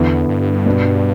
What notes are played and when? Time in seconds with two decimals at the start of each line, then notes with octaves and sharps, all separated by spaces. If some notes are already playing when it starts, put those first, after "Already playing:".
Already playing: E2 D3 B3 E4
0.29 G2
0.66 B2 B3 D4 B4